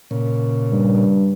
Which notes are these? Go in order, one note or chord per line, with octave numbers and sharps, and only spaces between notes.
A#2 C#3
G2